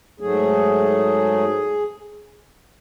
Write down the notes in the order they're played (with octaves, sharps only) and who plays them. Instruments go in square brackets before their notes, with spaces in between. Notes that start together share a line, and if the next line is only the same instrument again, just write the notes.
[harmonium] G#2 F#3 A3 G#4